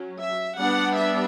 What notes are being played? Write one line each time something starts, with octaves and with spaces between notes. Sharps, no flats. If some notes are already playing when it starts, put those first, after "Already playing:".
Already playing: F#3 C#4
E5
G3 B3 D4 F#5
E5